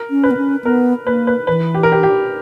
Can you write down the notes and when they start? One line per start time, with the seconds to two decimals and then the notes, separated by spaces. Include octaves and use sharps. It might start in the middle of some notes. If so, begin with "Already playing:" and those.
Already playing: A#4
0.10 C#4
0.23 B4
0.31 B3
0.37 C#4
0.64 B3 A#4
1.06 A#3 B4
1.27 B4
1.47 E3 B4
1.74 G4
1.83 A#4
1.92 G4
2.03 G4